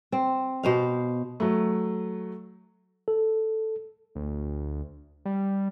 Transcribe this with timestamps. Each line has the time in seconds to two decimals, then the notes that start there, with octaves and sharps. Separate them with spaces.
0.12 C4
0.63 B2 C5 F5
1.40 F#3 A3
3.08 A4
4.15 D2
5.25 G3